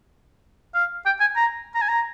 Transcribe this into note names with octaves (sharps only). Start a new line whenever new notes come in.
F5
G5
G#5
A#5
A#5
G#5
A#5